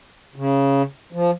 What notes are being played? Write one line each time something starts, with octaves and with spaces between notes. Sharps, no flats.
C#3
F3